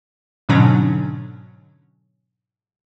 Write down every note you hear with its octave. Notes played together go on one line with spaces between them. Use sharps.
G#2 B2 D3 F#3 C#4 D4